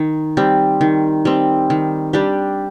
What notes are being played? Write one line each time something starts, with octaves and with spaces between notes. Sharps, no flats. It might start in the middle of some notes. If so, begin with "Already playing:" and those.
Already playing: D#3
G3 C4
D#3
G3 C4
D#3
G3 D4 G4